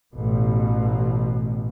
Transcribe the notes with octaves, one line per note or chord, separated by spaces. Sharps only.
A1 B2